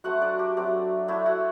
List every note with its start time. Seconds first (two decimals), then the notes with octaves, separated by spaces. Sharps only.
0.04 F#3 A3 C4 F#4 F#5
0.21 D4 D5
0.39 G4
0.57 F#3 A3 C4
1.08 A3 D4 E4 E5
1.26 F#4 F#5